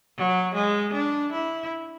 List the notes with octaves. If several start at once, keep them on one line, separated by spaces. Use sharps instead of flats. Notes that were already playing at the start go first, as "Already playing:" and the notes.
F#3
G#3
D4
E4